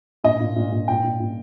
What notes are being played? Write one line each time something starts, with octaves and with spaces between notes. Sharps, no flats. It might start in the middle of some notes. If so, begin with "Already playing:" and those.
A#2 D#5
A#2
A#2
A#2
A#2 G5
A#2
A#2